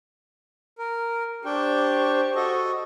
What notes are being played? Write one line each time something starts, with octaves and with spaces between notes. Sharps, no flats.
A#4
D4 G4 C5 G5 C#6
F#4 A4 D#5